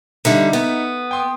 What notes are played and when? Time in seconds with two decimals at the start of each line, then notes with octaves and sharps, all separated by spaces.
0.25 D3 G3 D#4 E5
0.53 B3
1.11 G5 C6 D#6